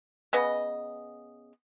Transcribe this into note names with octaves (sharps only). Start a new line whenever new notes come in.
C#3 B3 D#5